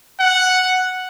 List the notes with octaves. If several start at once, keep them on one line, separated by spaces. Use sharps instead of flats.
F#5